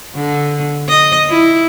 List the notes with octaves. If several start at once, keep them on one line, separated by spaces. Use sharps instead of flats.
D3
D#5
E4